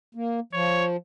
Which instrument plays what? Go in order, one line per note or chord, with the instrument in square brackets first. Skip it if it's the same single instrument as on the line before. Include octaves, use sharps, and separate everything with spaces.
[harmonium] A#3
[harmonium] F3 [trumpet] C#5